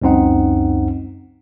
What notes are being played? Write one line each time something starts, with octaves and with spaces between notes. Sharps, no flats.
C#2 F#2 C4 D#4 F#5